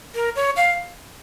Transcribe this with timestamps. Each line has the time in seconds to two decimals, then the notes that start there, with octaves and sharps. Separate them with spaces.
0.15 A#4
0.36 C#5
0.56 F5